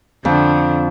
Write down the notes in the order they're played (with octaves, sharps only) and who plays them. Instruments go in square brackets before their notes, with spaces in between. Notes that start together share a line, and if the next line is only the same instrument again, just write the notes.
[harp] F2 [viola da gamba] D3